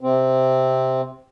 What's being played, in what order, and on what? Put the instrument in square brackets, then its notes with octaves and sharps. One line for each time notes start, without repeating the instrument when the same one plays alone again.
[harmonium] C3 C4